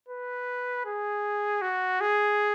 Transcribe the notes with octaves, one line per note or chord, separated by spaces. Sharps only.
B4
G#4
F#4
G#4